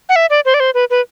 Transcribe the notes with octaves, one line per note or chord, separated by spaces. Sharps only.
F#5
E5
D5
C5
D5
C5
B4
B4